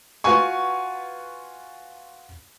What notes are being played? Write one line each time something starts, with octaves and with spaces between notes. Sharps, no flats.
F4 F#4 B4 F#5 G#5 C#6